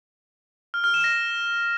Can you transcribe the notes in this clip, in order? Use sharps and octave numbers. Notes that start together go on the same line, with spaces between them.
F6
F6
E7
A#6